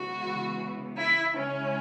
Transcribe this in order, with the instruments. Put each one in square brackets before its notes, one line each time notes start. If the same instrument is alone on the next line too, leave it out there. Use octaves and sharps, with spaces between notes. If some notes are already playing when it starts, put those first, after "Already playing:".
Already playing: [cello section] C#3 E3 G#3 B3 [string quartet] F#4
[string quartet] E4
[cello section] C#3 G#3 E4 [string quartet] C#4